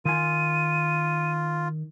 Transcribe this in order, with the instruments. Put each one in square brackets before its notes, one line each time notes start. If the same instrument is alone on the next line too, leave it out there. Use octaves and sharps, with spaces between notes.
[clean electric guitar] D#3 G#5 [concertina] F4 [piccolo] D#7